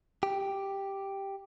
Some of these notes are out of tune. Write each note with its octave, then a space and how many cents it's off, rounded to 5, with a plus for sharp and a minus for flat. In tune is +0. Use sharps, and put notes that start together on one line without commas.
G4 +0